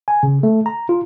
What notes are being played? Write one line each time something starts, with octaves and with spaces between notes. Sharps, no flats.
G#5
C#3
A3
A#5
F4